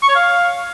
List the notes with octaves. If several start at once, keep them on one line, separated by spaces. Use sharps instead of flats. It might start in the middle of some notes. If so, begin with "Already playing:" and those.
C#6
C#5
F5